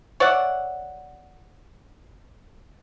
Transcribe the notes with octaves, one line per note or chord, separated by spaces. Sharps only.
C#5 D5 E5 F#5